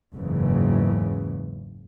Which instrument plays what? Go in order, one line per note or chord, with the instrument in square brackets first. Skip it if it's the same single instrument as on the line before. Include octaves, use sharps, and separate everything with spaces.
[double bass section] F#1 E2 G#2 C#3 E3